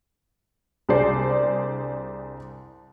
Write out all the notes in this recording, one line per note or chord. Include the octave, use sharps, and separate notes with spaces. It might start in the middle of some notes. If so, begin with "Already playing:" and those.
C2 D4 G#4 C5 D5 C7